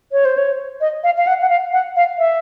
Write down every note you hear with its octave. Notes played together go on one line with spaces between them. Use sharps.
C#5
C5
C#5
D#5
F5
F5
F#5
F#5
F5
F#5
F5
E5